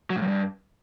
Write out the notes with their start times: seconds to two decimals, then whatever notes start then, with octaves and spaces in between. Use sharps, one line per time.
0.10 F#3
0.16 A2
0.22 F#2
0.28 G2